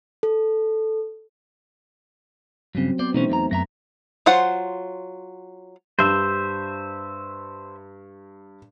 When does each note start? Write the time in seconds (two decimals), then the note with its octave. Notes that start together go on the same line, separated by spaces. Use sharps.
0.23 A4
2.75 G2 C#3 F#3 C4
2.99 B3 C5 D5
3.14 B2 E3 A3 C#4 D#4 C5
3.29 E2 A#5
3.51 F#2 F#3 E5 A#5 A#6
4.26 F#3 F4 C5 F#5
5.99 G2 C5 E5